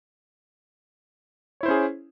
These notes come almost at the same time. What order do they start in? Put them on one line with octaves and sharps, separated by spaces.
C#5 E4 C5 C#4 G#4